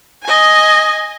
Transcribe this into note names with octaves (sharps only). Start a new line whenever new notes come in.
D#5 G#5